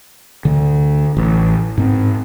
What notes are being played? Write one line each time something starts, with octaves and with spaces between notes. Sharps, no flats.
D2 D3
A1
G#2 C4